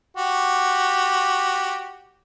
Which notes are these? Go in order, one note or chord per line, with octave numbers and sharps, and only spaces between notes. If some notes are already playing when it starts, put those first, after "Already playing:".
F#4 G4